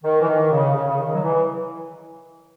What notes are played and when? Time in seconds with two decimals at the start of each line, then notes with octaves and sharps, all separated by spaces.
0.04 D#3
0.22 E3
0.28 D#3
0.52 C#3
0.75 C#3
0.88 C#3
0.99 D#3
1.14 F#3
1.22 E3